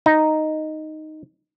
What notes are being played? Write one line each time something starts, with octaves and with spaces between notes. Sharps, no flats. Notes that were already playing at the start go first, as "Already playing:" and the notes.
D#4